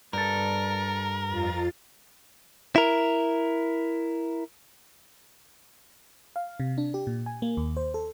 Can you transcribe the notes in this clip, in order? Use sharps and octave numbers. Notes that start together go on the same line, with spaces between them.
G2 A4 A#4
F2 F4 A6
E4 A#4
F5
C3
D4
G4
A#2
G#5
A#3
D#2
C5
A4